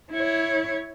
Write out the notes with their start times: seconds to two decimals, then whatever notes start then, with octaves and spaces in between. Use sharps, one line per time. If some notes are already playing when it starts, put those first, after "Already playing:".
0.13 E4 C#5